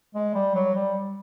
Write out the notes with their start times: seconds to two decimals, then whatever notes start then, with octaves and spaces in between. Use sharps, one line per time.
0.15 G#3
0.35 G3
0.55 F#3
0.74 G3